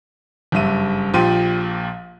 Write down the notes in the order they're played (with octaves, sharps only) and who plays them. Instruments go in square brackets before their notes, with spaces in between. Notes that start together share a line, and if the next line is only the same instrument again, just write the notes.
[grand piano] F#1 G2 E5 D#7
A#1 A#2 F3 G4 C6 D#7